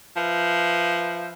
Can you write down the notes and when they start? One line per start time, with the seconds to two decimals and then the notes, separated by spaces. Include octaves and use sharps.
0.17 F3 B4 E5